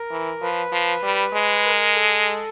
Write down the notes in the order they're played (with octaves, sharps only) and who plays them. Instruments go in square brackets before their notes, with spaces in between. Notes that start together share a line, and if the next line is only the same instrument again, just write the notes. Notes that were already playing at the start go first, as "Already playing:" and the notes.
Already playing: [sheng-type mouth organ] A#4
[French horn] E3
[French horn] F3 [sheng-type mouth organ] B4
[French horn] F3
G3
G#3
[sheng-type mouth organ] A#4
A4